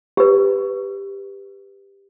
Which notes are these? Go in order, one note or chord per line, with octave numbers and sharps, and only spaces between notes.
G4 B4